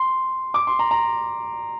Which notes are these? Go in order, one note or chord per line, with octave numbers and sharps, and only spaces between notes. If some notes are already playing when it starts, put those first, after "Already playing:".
Already playing: C6
D6
C6
A#5
A#5